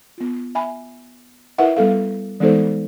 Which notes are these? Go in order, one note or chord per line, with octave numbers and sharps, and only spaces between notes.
B3 F4
E5 G#5 B5
E4 A#4 B4 E5 F#5
G3 B3 A4 F5
E3 G#3 B3 D#4 A4 C5